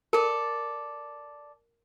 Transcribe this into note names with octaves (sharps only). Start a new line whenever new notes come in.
A4 A#4 D5